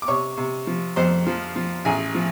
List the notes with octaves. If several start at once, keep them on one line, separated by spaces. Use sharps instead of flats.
D6
C3 C#5 C#6
C3
F3
F2 C5 C6
F3
F3
A1 G#4 G#5
F3